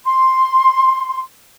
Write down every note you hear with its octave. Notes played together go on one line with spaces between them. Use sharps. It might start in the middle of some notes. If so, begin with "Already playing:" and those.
C6